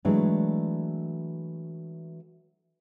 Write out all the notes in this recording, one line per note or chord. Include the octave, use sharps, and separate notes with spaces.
E3 F#3 G#3 A3 D4